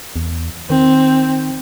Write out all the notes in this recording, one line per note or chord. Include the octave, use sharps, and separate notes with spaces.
E2
D#3 C4